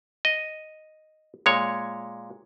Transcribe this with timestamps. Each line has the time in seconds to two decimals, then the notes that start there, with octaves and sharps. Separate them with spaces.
0.25 D#5
1.46 A#2 G#3 C#5